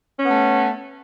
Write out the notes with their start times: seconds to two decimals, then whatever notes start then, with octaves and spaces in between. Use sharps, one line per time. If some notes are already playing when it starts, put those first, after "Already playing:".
0.19 C#4
0.23 B3
0.28 A3